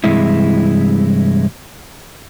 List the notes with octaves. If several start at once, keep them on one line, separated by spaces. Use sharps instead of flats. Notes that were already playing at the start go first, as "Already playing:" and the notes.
G2 C3 E3 G#3 E4